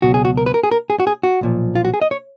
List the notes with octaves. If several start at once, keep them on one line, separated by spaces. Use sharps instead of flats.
C#2 B2 F#3 F#4
G#4
F#4
A#4
B4
A#4
G#4
A#4
G#4
F#4
G#4
F#4
B1 A#2 F3
F4
F#4
G#4
D#5
C#5